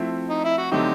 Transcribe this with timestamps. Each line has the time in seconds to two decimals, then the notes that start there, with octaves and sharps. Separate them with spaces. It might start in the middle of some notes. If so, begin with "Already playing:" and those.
Already playing: F3 A3 C4 E4
0.29 D#4
0.44 E4
0.58 F#4
0.71 D3 F#3 A3 C4 D#4 G4